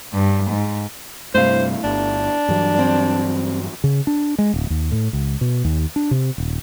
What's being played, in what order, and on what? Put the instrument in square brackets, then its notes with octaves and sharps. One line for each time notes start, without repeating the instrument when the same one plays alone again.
[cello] G2
G#2
[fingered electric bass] G2 C3 [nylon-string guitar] A3 E4 F5 [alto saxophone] C5
[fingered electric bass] G1 [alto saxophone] D4
[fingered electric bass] G2 E3 F#3
[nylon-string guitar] C4 D5
[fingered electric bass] C#3
D4
G#3
D1
D#2
A2
C#2
B2
D#2
D4
C3
D#1